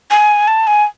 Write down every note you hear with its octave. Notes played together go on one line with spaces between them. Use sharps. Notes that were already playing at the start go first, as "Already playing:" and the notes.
G#5
A5
G#5